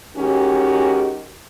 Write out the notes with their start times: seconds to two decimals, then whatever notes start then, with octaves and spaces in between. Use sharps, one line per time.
0.16 D#3 G#3 C#4 F#4 G4